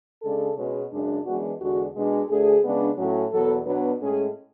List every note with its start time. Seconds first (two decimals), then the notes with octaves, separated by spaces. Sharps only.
0.22 C#3 G#3 D4 A4
0.57 B2 G#3 C#4
0.91 F#2 C#3 G#3 D4
1.25 F#2 E3 G#3 B3 D4 F#4
1.60 E2 D3 G#3 D4 F#4
1.94 B2 G#3 D4
2.28 D2 D3 A3 D4 G#4
2.63 C#3 G#3 B3 D4
2.97 A2 F#3 C#4
3.31 E2 B2 F#3 B3 A4
3.66 B2 F#3 B3 D4
4.00 A2 G#3 C#4 G#4